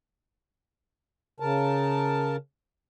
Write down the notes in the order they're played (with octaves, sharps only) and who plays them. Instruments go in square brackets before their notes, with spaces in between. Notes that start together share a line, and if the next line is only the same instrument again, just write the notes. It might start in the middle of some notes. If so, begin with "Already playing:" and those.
[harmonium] C#3 A#4 A5